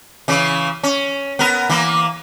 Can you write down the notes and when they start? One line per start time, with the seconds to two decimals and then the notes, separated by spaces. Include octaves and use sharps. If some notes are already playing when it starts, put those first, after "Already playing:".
0.28 C#3 E3
0.83 C#4
1.39 B3 A#4
1.70 E3 A#3